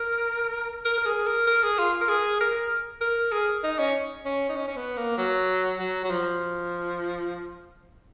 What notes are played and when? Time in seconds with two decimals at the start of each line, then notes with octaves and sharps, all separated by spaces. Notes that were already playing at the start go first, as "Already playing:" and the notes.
Already playing: A#4
0.85 A#4
0.98 A#4
1.06 G#4
1.27 A#4
1.47 A#4
1.63 G#4
1.79 F4
2.01 A#4
2.08 G#4
2.40 A#4
3.01 A#4
3.32 G#4
3.64 D#4
3.79 C#4
4.25 C#4
4.49 D#4
4.56 C#4
4.68 C#4
4.77 B3
4.97 A#3
5.17 F#3
5.79 F#3
6.04 F#3
6.10 F3